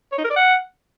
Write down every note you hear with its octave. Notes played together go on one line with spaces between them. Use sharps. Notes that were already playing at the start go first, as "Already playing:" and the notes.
C#5
D#4
A#4
D5
F#5